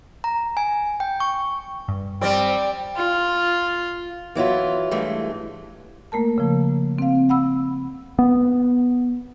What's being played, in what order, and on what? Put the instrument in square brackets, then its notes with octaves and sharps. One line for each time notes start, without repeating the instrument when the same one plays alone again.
[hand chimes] A#5
G#5
G5
C#6
[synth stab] G2
[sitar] G3 C4 [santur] D5 [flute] G5
[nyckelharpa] F4
[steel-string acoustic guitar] E3 F#3 E4 F4
G2 E3 G#3 A3
[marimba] A3 A#3 A#4 A5
C#3 F3
C4 F5
F#5 B5 E6
[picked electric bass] B3